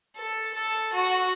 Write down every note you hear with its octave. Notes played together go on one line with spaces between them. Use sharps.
A4
A4
F#4